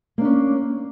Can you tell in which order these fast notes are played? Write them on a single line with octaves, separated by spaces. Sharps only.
A#3 D4 C#4